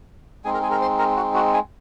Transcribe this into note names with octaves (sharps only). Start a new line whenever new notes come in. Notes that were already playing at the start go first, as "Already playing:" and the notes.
G#3 C4 D#4 G#4 G#5
A#4 A#5
G#4 G#5
A#4 A#5
C5 C6
A#4 A#5
F#4 F#5
F#4 F#5
G#4 G#5